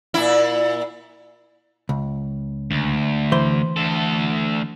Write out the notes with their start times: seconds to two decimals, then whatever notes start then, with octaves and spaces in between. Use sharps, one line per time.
0.14 A#2 E4
1.89 C#2
2.71 D2
3.32 E3 C5
3.76 D2 A4